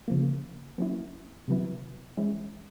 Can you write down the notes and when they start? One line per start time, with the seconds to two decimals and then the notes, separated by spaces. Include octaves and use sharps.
0.08 C#3 F3 A#3
0.78 F#3 A#3 C#4 E4
1.48 C3 D#3 F#3 B3 E4
2.17 E3 G#3 C#4 E4